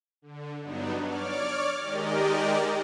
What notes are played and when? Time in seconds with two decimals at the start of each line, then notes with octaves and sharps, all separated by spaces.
0.22 D3
0.60 G2 F#3 B3 D4 D#4
1.00 C#5 D5 D6 F6
1.80 D#3 G#3 G4 A#4 D5 D#5